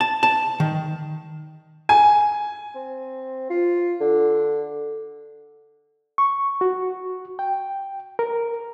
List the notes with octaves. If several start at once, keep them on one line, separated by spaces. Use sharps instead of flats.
A5
A5
D#3
G#5
C4
F4
D3
C#6
F#4
G5
A#4